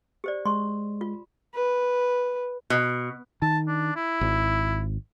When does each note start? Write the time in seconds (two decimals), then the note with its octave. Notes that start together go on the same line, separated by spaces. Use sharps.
0.24 G4 C5 D5
0.46 G#3 C6 C#6
1.01 F4
1.55 B4
2.70 B2
3.42 D#3 A5
3.68 D4
3.96 E4
4.21 G#1